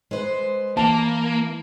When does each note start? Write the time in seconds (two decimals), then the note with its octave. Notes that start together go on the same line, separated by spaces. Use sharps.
0.11 G#3 B4 C5
0.77 E3 A#3 A5